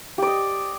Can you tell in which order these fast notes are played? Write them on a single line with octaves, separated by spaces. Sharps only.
G4 D5 D#5